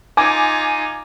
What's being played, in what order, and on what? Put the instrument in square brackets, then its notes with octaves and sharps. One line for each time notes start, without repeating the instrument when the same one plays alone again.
[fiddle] D#4 F4 [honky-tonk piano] G#5 D6 G#6